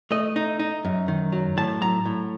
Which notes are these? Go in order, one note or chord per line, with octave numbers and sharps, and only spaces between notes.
A3 D#5
D#4
D#4
F#2
D#3
F#3
A2 A5
F#3 A#5
A2